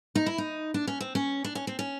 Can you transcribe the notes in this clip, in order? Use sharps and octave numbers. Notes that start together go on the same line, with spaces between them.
D#4
E4
D#4
D4
C#4
C4
C#4
D4
C#4
C4
C#4